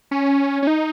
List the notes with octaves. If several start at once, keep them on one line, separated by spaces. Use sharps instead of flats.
C#4
C#4
D#4